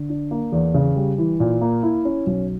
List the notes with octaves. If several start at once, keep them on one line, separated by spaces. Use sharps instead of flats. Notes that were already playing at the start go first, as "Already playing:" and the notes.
Already playing: D3
D4
A#3
E2
C#3
G3
E3
A#2
A#3
E4
C#4
B1